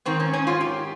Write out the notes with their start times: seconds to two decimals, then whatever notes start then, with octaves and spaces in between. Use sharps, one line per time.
0.05 G#2 D#3 C4
0.20 C#4
0.33 C#4
0.47 F4
0.61 G4